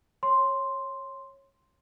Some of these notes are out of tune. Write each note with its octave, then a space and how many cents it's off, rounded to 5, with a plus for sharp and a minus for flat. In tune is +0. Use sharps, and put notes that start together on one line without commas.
C#5 -15 C6 +0